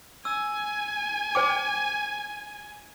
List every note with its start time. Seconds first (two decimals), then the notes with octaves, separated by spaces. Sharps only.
0.25 G#5 E6
1.35 C5 G5 D6